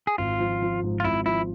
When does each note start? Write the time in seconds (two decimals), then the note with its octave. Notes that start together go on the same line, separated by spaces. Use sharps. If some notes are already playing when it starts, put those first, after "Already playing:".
0.07 G#4
0.18 G#1 F4
0.40 F3
0.62 F3
0.83 G#2
1.00 F4
1.04 G#1 E4
1.26 F3 E4